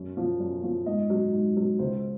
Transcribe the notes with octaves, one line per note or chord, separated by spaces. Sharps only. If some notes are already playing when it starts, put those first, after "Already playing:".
Already playing: F#2
F3
F#2
F3
G#2 D#5
F#3
G#2
F#3
C#2 C5